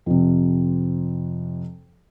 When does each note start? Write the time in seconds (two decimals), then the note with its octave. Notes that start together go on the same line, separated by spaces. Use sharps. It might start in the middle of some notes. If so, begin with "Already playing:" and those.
0.06 F2 C3